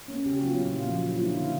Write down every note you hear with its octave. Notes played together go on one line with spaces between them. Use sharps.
A#3 C#4
C#3 G4
F#4
F#3 B3 F4
F4
A#2 E4
F3 A#3
F#3 F4
E4
A#3 D4 F4
D3 E4